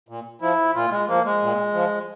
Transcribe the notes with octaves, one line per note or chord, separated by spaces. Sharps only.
A#2
F3 E4
A#2 F4
G#3
F3 A#3
G#3
A#2
F3